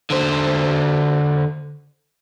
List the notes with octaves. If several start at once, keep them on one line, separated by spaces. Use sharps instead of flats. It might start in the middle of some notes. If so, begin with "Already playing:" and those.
D3 C5